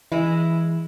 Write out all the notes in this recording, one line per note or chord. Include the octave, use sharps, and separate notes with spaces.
E3 G#3 E4